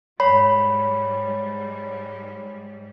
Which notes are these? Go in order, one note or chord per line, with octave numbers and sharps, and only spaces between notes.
G#2 G3 C#5 B5